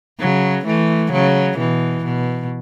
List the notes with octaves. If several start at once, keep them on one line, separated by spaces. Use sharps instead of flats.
C#3 F#3
E3 A3
C#3 F#3
B2 E3
B2